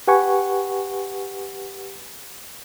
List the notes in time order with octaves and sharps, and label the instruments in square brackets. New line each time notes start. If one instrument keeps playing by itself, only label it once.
[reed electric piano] G4 B4 F#5 G#5 C#6